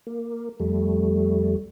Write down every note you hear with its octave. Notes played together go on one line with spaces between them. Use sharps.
A#3
F2 G3 A3